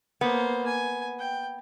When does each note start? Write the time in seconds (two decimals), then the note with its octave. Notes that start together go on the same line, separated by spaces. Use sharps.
0.21 A#3 B3 C5
0.66 G#5
1.19 G5